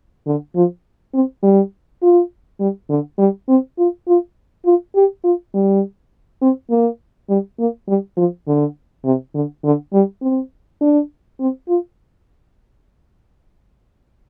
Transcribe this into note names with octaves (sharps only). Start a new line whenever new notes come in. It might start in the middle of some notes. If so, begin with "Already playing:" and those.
D3
F3
C4
G3
F4
G3
D3
G3
C4
F4
F4
F4
G4
F4
G3
C4
A#3
G3
A#3
G3
F3
D3
C3
D3
D3
G3
C4
D4
C4
F4